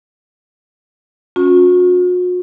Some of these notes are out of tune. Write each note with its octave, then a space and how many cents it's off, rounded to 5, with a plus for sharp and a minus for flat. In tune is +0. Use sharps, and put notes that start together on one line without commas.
C#4 +0 F#4 -45